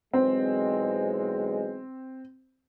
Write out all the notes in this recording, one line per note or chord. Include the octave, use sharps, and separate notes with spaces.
B1 E2 G#3 C4